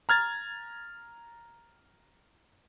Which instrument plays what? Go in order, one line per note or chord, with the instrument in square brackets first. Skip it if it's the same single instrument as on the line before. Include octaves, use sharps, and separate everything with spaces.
[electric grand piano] A#5 F6 G#6 A6